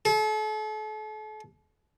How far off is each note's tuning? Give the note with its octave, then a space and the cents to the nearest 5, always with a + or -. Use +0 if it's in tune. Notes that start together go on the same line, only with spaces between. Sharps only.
A4 -40